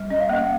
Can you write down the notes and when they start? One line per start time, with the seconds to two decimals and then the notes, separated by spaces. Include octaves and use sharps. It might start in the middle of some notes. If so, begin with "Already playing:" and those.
Already playing: G3
0.10 C#4 D#5
0.21 F5
0.29 A#3 D#5
0.39 F5